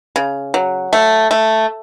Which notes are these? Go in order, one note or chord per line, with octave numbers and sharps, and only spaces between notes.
C#3
F#3
A3
A3